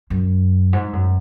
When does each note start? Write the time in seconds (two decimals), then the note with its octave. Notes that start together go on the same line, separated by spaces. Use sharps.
0.10 F#2
0.73 G#2
0.93 F#2